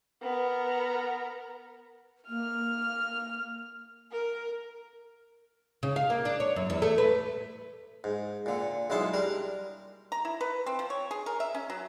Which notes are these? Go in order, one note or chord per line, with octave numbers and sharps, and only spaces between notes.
B3 A#4
A#3 F6
A#4
C#3
F5
A#3
D4
C#5
F#2
E2
A3
B4
G#2
A#2 D3
B1 D3 G#3 E4 A5 C6
G3 D4 A#4
A#5
E4
B4
C4
F3
C#5
G#4
A#4
E5
C#4
F#3